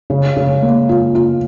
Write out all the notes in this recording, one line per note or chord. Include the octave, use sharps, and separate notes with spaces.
C#3
C#3
A#3
F4
F4